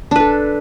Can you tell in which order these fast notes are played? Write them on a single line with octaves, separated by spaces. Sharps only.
D4 B4 A4